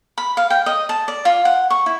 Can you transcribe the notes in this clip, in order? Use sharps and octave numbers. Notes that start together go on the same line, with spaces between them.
B5
F5
G5
D#5
A5
D5
F4
F#5
C#6
E4